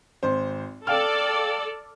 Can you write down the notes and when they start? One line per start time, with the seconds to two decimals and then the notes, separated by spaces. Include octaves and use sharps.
0.23 G#1 C5
0.87 A4 D5 F5 G5 F6